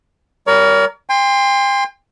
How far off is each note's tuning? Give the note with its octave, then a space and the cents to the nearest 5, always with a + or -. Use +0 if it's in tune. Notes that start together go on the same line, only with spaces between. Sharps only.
G3 +0 A#4 +0 C#5 +45
G5 +40 C6 +0